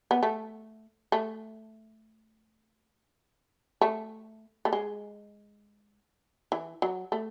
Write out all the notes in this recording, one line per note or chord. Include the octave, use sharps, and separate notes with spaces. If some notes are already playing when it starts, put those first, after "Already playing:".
B3
A3
A3
A3
A3
G#3
E3
F#3
A3